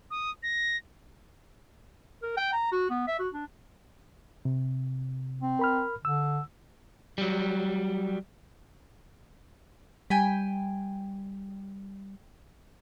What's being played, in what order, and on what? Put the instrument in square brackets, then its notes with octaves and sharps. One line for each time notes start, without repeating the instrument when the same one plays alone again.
[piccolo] D#6
A#6
[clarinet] A#4
G5
A#5
F#4
B3
E5
F#4
D4
[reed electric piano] C3
[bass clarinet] C4
[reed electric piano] A#4 B5 F6
[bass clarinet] D3 [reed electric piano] E6
[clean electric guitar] F#3 G3
[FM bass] G3 [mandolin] G5 G#5 B5